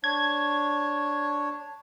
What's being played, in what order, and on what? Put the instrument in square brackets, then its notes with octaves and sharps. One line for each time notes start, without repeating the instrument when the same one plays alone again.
[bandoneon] D4 C#5 [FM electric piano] G#6